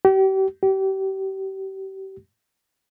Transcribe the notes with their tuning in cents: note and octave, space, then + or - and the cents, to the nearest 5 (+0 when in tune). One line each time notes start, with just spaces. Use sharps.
G4 -35
G4 -30